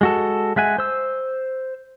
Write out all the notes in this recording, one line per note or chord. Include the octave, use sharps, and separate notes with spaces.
G#3 F#4 A4
G#3 E5 F#5 G#5
C5 E6